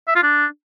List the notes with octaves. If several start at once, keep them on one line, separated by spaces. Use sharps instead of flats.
E5
F4
D4